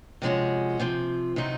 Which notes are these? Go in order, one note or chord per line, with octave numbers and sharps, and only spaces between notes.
C3 F3 G#3 C#4 F#4
C3 F3 C4
C3 D#3 F#3 C4 D#4